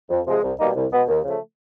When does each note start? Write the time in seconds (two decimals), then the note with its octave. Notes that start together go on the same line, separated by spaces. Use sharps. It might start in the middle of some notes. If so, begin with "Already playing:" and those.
0.09 F2
0.25 C3 F3 G#3
0.42 C2
0.57 B2 G3 A#3 D#4
0.75 C2
0.91 B2 G#3 B3
1.08 D#2
1.24 C#3 F3 A3